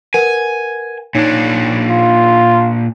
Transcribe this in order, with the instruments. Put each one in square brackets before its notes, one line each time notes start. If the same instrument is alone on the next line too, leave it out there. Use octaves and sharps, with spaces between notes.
[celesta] A#4 B4 F#5 [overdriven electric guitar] G#5
[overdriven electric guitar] A#2 D4 [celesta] D#4 C#5
[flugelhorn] F4